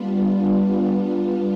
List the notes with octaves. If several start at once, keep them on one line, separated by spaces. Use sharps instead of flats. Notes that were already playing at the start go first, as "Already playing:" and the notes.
Already playing: G3 B3 D4 F4